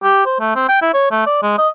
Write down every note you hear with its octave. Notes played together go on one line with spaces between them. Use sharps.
G4
C5
A3
C4
G5
E4
C#5
A3
D5
G#3
D#5